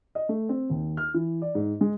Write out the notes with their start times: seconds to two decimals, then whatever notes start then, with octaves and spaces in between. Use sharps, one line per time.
0.15 D#5
0.29 A3
0.49 C4
0.70 D#2
0.97 F6
1.14 E3
1.42 D5
1.55 G#2
1.81 G#3